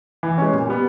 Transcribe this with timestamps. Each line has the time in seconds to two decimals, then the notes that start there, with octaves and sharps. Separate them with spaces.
0.23 E3
0.38 G#3 C#4
0.53 A#2
0.67 G3 B3